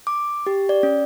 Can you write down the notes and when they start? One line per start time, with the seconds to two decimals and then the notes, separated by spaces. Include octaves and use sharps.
0.07 D6
0.47 G4
0.69 D5
0.83 C#4